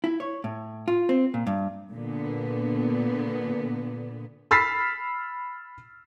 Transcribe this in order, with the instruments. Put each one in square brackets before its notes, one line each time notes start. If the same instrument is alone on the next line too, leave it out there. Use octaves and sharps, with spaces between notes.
[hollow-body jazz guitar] E4
C#5
A2
F4
C4
A#2
G2
[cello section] A#2 D3 B3
[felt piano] B5 E6 F6 A6 B6 C7